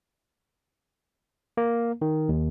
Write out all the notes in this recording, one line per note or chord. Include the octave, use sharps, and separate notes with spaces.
A#3
D#3
D#2